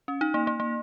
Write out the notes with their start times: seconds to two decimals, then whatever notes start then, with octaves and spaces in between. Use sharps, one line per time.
0.08 C#4
0.21 D#4
0.34 A#3
0.47 A#3
0.60 A#3